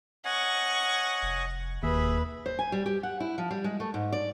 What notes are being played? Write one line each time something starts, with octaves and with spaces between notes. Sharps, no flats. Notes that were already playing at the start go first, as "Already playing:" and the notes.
C#5 D#5 F#5 G#5 C#6
F1
E1 D#2 G#4 B4 E5
C5
G#5
G3
G4
F#5
E4
F3
G3
G#3
A3
G#2
D5